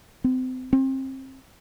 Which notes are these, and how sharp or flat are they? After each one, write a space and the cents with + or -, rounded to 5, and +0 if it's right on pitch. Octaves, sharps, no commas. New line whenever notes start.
C4 -35
C4 +30